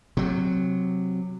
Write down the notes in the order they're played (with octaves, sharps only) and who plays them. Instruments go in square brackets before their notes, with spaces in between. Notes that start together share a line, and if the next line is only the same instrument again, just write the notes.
[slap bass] C3 F#3